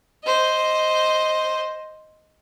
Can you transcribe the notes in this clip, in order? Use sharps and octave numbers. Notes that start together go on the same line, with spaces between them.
C5 D#5